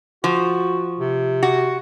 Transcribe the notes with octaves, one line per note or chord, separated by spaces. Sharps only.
F3 F#4
C3
F#4